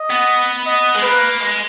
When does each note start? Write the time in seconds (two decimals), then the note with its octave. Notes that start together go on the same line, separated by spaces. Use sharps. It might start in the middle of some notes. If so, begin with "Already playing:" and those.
Already playing: D#5
0.10 B3
0.66 D#5
0.95 G#3
1.02 A#3 B4
1.41 G#3